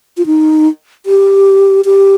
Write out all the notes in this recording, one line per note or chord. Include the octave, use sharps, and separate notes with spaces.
F4
D#4
G4
G4